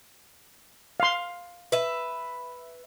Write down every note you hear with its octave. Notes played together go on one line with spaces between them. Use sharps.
F5 C6
B4 E5